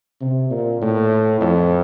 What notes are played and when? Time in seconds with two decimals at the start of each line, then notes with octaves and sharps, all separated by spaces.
0.21 C3
0.51 A#2
0.82 A2
1.41 F2